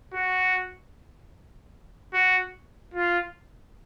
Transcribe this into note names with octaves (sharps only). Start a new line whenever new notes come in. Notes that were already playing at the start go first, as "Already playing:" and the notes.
F#4
F#4
F4